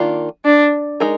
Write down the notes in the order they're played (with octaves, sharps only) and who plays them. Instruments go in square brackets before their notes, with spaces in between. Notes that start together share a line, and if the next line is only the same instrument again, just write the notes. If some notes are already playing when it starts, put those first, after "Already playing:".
Already playing: [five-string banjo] D#3 A#3 D4 F4
[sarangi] D4
[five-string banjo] G#3 D#4 A#4